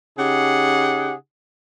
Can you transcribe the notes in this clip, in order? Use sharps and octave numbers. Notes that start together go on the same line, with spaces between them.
C#3 D#4 G4 G#4 F#5